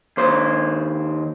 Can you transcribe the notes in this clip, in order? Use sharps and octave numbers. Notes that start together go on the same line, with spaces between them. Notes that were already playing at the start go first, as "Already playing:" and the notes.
D#2 C5